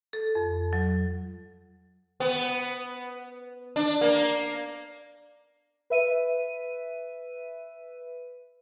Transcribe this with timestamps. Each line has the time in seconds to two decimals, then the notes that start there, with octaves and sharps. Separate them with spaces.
0.13 A4
0.35 F2
0.73 F#3
2.20 B3
3.76 D4
4.01 A#3
5.90 B4 E5 D#7